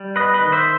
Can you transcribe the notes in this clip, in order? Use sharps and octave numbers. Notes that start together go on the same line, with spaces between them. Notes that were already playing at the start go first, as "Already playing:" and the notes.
Already playing: G3
B3 B4 D#5
B4 D#5
D#3
C5 E5